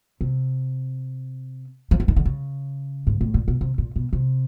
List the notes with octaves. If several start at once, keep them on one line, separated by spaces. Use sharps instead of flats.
C3
F3
E3
D#3
D3
C#3
G#2
A2
A#2
B2
C3
A#2
B2
C3